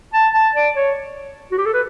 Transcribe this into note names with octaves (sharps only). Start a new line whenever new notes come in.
A5
A5
D5
C#5
F#4
G4
A4
B4